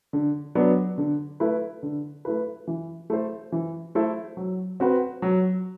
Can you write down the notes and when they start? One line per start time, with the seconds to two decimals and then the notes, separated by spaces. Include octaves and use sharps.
0.13 D3
0.55 F#3 B3 D4
0.98 D3
1.40 A3 E4 B4
1.83 D3
2.25 A3 E4 B4
2.67 E3
3.10 A3 E4 A4 C5
3.52 E3
3.95 A3 E4 A4 C5
4.37 F#3
4.80 C4 F#4 B4
5.22 F#3